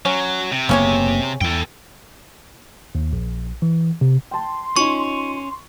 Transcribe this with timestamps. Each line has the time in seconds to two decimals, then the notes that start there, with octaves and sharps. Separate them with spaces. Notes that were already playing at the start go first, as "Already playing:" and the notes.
0.05 F#3 C#4
0.52 C3
0.69 F#1 C#3 A#3 B3 C#4 C#5
1.41 E2 A4 G5
2.95 D#2
3.13 A#1
3.62 E3
4.01 C3
4.31 G5 A5 C6
4.76 C#4 D#4 F4 C#6